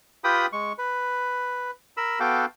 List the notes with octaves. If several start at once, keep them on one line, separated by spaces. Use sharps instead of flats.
F4 G4 B4 G5 B5 D#6
G#3 C#6
B4
A#4 B5 E6
B3 F#4 A4 F5 G5 D6